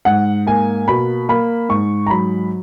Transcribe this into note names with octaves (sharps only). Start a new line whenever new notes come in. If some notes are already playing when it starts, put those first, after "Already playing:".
G#2 F#5
A#3 G#5
B2 B5
A#3 B5
G#2 C#6
A#5
F#3 B5